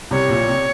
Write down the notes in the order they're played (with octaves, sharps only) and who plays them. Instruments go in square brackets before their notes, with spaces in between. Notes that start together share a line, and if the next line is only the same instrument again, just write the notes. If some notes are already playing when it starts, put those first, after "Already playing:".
[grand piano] C2 C3 [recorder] C#5
[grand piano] A#1 A#2
C3